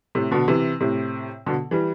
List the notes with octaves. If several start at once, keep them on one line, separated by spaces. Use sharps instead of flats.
A2 C3
B2 D3
C3 E3
A2 C3
B2 D3
E3 G3